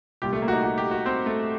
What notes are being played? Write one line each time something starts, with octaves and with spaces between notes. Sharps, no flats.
C2 A#2 G3 G4
A3
A#3
F#4
D#4
F#4
G4
F#4
C4
A3